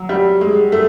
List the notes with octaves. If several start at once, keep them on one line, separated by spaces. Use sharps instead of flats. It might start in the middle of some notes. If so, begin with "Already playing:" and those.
Already playing: F#3
G3
G#3
A3